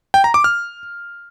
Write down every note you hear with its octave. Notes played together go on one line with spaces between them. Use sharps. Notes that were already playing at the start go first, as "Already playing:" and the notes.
G5
A#5
D6
F6